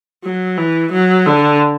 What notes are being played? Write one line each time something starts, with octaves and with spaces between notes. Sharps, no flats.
F#3
E3
F#3
D3